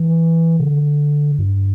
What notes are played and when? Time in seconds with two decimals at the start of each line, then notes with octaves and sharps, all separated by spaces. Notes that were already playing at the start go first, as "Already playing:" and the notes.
Already playing: E3
0.60 C3
0.64 D3
1.39 G2